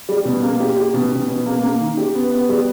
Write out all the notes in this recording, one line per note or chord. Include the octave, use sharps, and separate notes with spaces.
G3
B2
A#3
G4
G4
B2
B2
B2
A#3
A#3
D#3
G4
B3
B3
G3